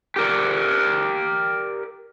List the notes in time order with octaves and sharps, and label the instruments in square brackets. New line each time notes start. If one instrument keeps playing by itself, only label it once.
[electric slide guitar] G4 A#4 D5